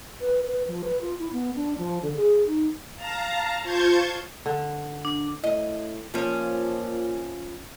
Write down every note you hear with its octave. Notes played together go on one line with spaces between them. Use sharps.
B4
B4
F3
B4
F4
E4
B3
D4
F3
D3
G#4
D#4
F5 A5 A#5
F4 C5 A5 C#6 G6 G#6
D3
D4
A2 D#5
A#2 F3 C#4